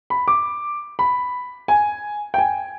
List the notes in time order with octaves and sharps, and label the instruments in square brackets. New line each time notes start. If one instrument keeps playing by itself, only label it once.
[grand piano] B5
D6
B5
G#5
G5
G#5